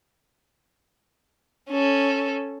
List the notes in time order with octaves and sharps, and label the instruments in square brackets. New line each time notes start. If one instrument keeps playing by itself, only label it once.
[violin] C#4 A4